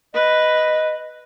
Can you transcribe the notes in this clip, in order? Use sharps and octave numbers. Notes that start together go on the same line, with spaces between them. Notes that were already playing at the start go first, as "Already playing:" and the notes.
B4 D#5